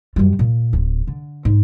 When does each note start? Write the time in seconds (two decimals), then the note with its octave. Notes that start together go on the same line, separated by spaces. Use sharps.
0.16 F#2 G3
0.39 A#2
0.73 D1
1.07 D3
1.45 G#2